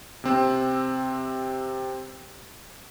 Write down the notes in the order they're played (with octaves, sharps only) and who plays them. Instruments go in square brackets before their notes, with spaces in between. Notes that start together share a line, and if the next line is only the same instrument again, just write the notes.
[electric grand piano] C3 C4 E6